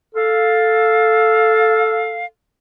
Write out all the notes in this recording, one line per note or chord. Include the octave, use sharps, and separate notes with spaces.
A4 F5